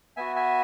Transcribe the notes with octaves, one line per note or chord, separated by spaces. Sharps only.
B3 F#4 E5 G#5
E5 G#5